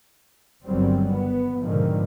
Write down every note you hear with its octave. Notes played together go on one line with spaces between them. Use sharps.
G1 D#3 F#3 G3 C4
B3
G#2 B2 D3 D#3 F3